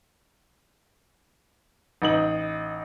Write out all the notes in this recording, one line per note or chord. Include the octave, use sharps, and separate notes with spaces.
A1 D#4 F#7